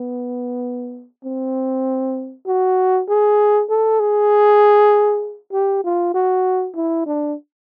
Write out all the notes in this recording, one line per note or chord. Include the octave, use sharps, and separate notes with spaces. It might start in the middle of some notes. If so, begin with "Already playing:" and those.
Already playing: B3
C4
F#4
G#4
A4
G#4
G4
F4
F#4
E4
D4